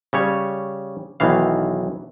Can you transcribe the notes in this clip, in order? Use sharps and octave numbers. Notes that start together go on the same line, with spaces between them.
C#3 G3 C#5
B1 D#3 E3 F5